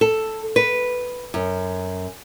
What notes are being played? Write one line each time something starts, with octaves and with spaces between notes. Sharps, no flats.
A4
B4
F#2